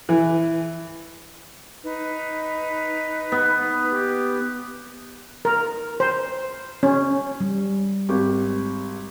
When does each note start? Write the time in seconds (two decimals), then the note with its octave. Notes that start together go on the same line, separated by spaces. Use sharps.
0.09 E3
1.83 D#4 B4
3.32 B3
3.91 G4
5.45 A#4
6.00 C5
6.83 C#4
7.40 G3
8.09 G#1 G4